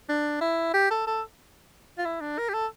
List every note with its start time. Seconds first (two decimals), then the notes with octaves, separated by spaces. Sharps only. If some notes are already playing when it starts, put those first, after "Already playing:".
0.09 D4
0.41 E4
0.74 G4
0.91 A4
1.07 A4
1.98 F4
2.05 E4
2.21 D4
2.38 A#4
2.49 G4
2.54 A4